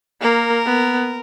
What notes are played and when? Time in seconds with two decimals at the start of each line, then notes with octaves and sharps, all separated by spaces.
0.21 A#3 A#4
0.66 B3